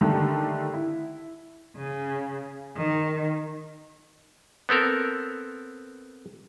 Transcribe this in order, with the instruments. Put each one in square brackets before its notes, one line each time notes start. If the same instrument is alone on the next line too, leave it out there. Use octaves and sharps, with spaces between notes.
[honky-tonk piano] D3 D#3 A3 G4
E4
[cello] C#3
D#3
[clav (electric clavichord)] B3 C4 A4 A#4